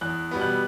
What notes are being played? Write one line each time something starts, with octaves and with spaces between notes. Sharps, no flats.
E2 F#6
B2 G3 B3
F#6